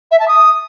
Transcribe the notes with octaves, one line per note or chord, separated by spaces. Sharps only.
E5
A5
D#6